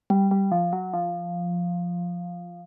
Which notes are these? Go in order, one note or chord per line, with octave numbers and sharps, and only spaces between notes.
G3
G3
F3
F#3
F3